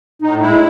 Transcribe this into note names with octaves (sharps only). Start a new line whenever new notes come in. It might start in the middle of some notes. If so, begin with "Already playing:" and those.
A2 D#4
G#3 E4